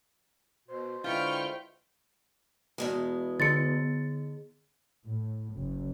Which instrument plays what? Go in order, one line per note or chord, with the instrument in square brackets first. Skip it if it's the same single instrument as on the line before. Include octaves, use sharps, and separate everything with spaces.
[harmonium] B2 [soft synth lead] C5
[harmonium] D3 G#3 E4 [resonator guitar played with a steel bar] F4 B4 [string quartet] G5 C#6 F6
[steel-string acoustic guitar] E2 B2 G#3
[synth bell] D3 B3 G#4 [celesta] A6 C#7
[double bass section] A2
F#1